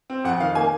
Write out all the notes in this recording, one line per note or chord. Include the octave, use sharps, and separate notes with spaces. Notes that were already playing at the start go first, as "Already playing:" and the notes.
C4
F2 F#5
D#3 F5
A#3 G#5